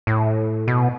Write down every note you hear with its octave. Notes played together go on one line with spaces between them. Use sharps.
A2
B2